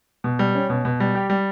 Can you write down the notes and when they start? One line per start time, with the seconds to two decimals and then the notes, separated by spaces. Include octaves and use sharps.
0.24 B2
0.39 G3
0.55 C#4
0.70 B2
0.85 B2
1.00 G3
1.15 G4
1.30 G3